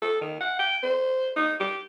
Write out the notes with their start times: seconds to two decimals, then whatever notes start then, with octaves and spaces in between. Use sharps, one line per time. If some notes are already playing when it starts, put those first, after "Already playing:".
0.02 A4
0.21 D#3
0.41 F#5
0.59 G5
0.83 C5
1.36 D#4
1.60 G4